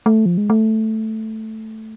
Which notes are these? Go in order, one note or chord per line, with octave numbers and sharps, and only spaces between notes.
A3
F3
G#3
A3